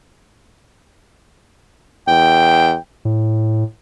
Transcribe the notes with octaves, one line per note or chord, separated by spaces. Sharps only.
E2 G5
A2